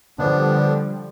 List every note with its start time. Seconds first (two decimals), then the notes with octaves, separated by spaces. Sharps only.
0.19 D3 F3 G3 B3 D4